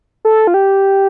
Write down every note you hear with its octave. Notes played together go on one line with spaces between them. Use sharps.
A4
F4
G4